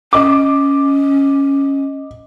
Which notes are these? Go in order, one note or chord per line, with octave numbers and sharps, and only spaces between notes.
C#4 D#5 D6